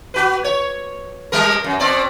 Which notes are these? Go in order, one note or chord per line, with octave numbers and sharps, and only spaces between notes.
F#4 B4
C#5
G3 B3 A#4
F#2
B2 C4 D5